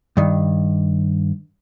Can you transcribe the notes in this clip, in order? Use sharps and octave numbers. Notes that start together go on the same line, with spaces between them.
G2 D#3